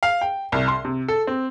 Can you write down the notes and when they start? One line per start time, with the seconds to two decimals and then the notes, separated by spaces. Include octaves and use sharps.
0.03 F5
0.21 G5
0.52 C2
0.68 C6
0.85 C3
1.08 A4
1.27 C4